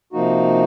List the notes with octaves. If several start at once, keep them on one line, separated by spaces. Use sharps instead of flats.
C3 F3 A#3 D#4 F#4